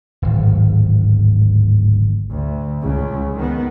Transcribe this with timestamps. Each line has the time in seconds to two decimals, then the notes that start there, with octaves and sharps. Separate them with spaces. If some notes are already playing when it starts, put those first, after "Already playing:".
0.22 D1 G#1
2.30 D2
2.82 C#2 C#3
3.35 D#3 B3